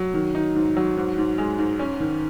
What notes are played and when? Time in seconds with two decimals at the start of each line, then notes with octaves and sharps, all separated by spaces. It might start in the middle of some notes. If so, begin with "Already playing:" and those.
Already playing: F#3
0.14 D#3
0.35 D#4
0.55 G#2
0.77 F#3
0.97 G#2
1.18 G#2
1.38 G#3
1.58 G#2
1.79 C#4
2.00 D#3